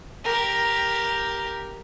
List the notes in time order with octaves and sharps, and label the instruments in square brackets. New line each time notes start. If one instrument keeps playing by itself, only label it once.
[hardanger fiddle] G4 A#4